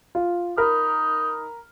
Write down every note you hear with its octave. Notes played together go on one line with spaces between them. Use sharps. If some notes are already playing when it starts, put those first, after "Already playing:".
F4
D#4 A#4 B5 F6